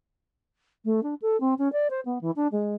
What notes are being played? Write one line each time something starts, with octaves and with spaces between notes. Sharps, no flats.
A3
D4
A4
C4
C#4
D5
C5
B3
E3
D4
G#3